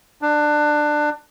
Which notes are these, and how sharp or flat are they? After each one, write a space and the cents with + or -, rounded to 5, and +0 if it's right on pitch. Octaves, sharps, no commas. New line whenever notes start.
D4 +20